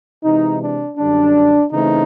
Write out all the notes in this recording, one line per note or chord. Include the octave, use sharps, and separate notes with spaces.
C3 E3 G#3 D#4
D4
F#2 D3 G3 D4
C#3 E3 A3 C4 D#4